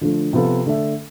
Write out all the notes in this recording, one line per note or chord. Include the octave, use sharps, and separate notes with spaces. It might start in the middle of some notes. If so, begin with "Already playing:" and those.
D3 F3 A3
C3 F3 B3 F4 A4
D3 A3 D4 A4 E5